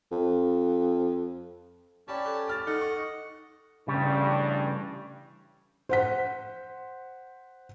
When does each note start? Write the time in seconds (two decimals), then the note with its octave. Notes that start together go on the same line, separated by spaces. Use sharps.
0.12 F2
2.08 C#4 G4 C#5 D5 A5 B5
2.26 A4
2.48 D6 F6 A6
2.67 D#4 A4 D#5 F#5
2.81 C#6
3.88 A1 G2 C#3 G3
5.89 C5 F#5 B6